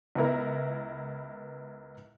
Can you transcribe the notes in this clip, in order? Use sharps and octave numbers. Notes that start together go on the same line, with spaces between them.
C#2 B3 E4 A#4